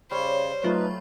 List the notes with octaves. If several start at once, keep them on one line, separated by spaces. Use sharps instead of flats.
C#3 G3 C5 C#5
F#3 A3 D#4 F4 B4